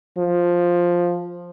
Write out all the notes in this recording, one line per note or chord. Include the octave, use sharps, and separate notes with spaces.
F3